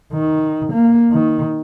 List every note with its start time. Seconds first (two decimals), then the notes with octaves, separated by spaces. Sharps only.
0.13 D#3
0.72 A#3
1.12 D#3